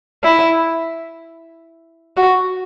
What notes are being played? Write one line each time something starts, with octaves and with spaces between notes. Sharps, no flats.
E4
F#4